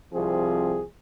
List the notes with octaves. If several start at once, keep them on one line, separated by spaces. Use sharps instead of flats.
C2 F3 C4 G#4